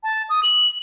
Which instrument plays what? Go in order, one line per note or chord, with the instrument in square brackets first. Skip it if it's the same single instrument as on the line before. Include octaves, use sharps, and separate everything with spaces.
[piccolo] A5
D#6
F#7